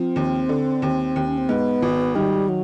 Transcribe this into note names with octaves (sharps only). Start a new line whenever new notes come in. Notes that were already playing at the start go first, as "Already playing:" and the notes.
Already playing: F3 C4
D#2
D3
D#2
D#2
C#4
C4
G#2 B3
G#1
D#3 G3
F#3